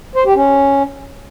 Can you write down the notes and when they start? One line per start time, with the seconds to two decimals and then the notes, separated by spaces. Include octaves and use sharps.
0.16 C5
0.26 G4
0.36 C#4